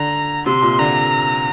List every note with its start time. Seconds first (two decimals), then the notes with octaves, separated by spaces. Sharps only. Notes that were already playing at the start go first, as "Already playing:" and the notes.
Already playing: D3 A#5
0.46 C3 C6
0.62 A#2
0.79 D3 A#5